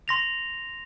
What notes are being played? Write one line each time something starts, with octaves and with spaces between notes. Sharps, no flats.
C6 A#6 F7